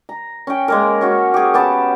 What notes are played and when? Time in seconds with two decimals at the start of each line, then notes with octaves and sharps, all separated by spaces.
0.09 A#5
0.47 C#4 G5
0.68 G#3 A#3 A#4
1.01 C#4 F#4 C#5
1.34 G4 G#4
1.54 B3 G4 A5